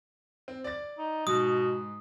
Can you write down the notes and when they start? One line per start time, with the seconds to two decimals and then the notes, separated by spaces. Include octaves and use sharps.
0.48 C4
0.64 D5 A6
0.98 D#4
1.27 G#2 B2 D#6